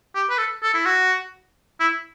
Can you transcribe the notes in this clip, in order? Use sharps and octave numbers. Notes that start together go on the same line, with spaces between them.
G4
B4
A4
A4
E4
F#4
E4